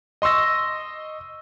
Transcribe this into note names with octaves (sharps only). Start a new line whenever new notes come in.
D#5 C6 C#6 E6 A#6